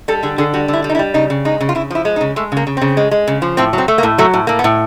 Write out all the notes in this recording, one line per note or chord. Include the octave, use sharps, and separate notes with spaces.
G3 A4
D3 G#4
D3 G#4
G3 F#4
D3
E4
G3
D#4
E4
G3
C#3 D#4
C#3
G#3 D#4
C#3
F4
C#3 E4
F3 E4
G#3
D#4
C#3
G#3 A3
C#3 A#3
C#3
C#3 C4
G#3
G#3
C#3
F3
A2 C4
F#3 C4
A3
A#3
A2
F#3 A3
A2
A2 A#3
B3
A2